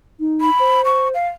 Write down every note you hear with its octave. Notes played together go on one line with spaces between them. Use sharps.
D#4
B5
C5
C#6
F5